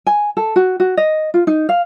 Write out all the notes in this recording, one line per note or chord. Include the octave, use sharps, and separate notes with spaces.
G#5
A4
F#4
F#4
D#5
F4
D#4
F5